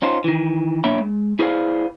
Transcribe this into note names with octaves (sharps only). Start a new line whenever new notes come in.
C#4 D#4 F4 C5
D#3 E3
B1 A#3 D4 C#5 E5 B5
G#3
E4 G#4 B4 C5 D5 F5